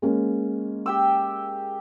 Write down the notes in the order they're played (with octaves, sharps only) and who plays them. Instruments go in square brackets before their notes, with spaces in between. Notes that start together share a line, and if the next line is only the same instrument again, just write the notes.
[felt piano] G#3 A#3 C#4
[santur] G4 G5 E6